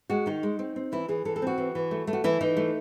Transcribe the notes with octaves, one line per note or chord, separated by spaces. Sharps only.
G#3 F#4
D#3 D#4
G#3
C4
C4
E3 E4
E3 G#4
E3 A4
A4
C4 F#4
E3
E3
A3
A3
F#4
E3 E4
E3 D#4
A3